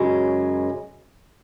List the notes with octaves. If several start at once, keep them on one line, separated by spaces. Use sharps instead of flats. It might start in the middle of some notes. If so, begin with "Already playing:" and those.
Already playing: F#2 C#3 G#3